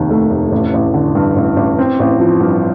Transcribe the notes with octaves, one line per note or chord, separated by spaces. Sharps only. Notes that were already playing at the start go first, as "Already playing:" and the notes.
Already playing: F1 D#2 D#3
A3
F1
A1
A1
D3
G2
A1
A1
C4
A1
F3
G2